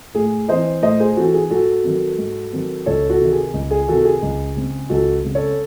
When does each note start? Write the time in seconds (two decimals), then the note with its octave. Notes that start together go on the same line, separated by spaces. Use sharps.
0.15 A2 G#4
0.49 E3 C4 C5 D#5
0.82 A2 C5 D#5
1.00 G#4 C5
1.17 E3 C4 F#4 A4
1.34 G#4
1.50 G#2 F#4 A4
1.84 D#3 F#3 C4
2.18 G#2
2.52 D#3 F#3 C4
2.86 C#2 A4 C#5
3.10 F#4 A4
3.20 C3 D#3
3.32 G#4
3.54 C#2
3.71 G#4
3.88 C3 D#3 F#4 A4
4.05 G#4
4.22 C#2
4.56 C#3 G#3 C4
4.89 C#2 F#4 A4
5.24 C#3 G#3 C4
5.35 A4 C#5